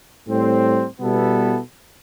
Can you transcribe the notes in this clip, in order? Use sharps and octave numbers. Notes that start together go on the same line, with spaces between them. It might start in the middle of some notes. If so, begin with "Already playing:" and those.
A2 G3 C4
B2 G3 B3 E4 A4